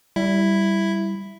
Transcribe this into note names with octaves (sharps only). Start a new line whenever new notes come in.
G3 E4